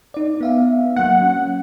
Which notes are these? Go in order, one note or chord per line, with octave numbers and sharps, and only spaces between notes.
D#4 D5
B3 E5 F5
F#3 A#3 F#5
C#4